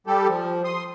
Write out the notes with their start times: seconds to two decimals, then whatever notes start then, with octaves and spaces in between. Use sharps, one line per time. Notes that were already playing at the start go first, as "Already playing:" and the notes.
0.07 G3 G4 A4
0.28 F3
0.64 C6 D#6